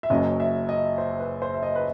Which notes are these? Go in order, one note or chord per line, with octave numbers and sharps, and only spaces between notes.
E5
F#1 F#2 F#3 D#5
E5
D#5
C5
B4
C5
E5
D#5
B4